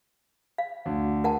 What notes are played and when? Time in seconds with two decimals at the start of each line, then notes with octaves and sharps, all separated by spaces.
0.58 F5
0.86 D2
1.24 A#4 F#5 A5